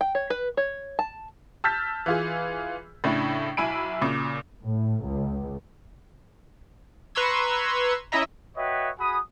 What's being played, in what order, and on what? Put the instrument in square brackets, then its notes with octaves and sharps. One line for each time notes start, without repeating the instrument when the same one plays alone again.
[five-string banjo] G5
C#5
B4
C#5
A5
[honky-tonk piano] A5 E6 F6 G6 A6 B6
E3 F4 G#4
A2 C#3 D4 E4
B1 E4 E5 G#5 B5 D7
A#2 C#3 D6
[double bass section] A2
C#2
[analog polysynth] B4 A#5 C6 C#6 E6 G#6
C#4 E4 D#5 E5 A#5
[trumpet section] F#4 B4 C#5 D#5 E5 G5
F#4 G#4 G#5 B5 D#6